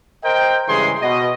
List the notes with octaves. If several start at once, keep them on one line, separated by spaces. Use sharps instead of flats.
A#4 C5 D#5 G5
G2 C#3 E3 G#3 G#4 C6
B2 D#5